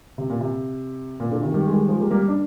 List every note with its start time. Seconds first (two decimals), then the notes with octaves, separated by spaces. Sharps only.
0.18 C3
0.30 A#2
0.41 C3
1.20 A#2
1.32 A#2 D3
1.43 C3 D#3
1.54 D#3 G3
1.67 G#3
1.72 D#3 G3
1.88 F3 G#3
2.00 G3 A#3
2.11 G3 A#3
2.28 D4